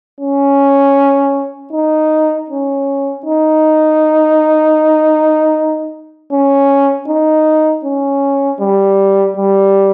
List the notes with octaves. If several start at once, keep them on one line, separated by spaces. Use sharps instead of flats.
C#4
D#4
C#4
D#4
C#4
D#4
C#4
G3
G3